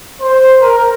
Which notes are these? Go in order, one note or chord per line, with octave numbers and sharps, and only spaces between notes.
C5
A#4